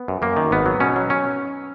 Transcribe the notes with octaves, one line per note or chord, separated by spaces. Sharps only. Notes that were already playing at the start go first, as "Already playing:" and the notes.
Already playing: B3
F#2
F#2 A#3
D#3
G#1 B3
F#3
B2 C#4
F#3
C#4